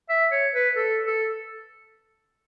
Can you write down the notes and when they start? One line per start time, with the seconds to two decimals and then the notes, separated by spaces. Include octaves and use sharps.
0.09 E5
0.31 C#5
0.54 B4
0.76 A4
1.06 A4